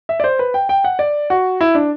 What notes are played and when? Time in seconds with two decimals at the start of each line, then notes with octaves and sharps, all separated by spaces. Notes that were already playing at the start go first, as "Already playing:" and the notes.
0.09 E5
0.20 D5
0.24 C5
0.39 B4
0.54 G5
0.69 G5
0.84 F#5
0.99 D5
1.30 F#4
1.61 E4
1.75 D4